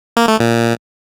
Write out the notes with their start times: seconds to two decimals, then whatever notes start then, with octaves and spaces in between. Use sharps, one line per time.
0.17 A#3
0.28 A3
0.40 A#2